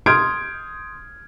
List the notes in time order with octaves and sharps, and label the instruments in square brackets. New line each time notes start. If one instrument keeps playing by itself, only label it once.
[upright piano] C6 D#6 F6 G6 G#6 D7